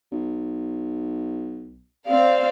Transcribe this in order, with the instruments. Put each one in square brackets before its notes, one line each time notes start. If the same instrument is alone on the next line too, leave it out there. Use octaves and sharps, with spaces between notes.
[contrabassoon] B1
[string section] C4 D5 F5